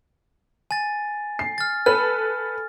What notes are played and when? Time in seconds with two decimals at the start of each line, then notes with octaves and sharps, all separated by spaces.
0.71 G#5 A6
1.39 C7
1.58 F6 A6
1.86 A4 B4 F6